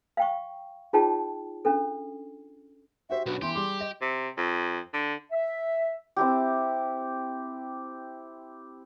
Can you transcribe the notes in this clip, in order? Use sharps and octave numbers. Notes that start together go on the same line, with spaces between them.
F5 G5 C#6
D#4 F4 G#4 C#5 G5 A5
C#4 D4 A4
F#4 G4 C5 E5
B1 C#4 D4 F#4 B4
E3 B3 E4 G4 C6
G3 G#4 C6 D6
D#5
C3
F2
D3
E5
C4 E4 G4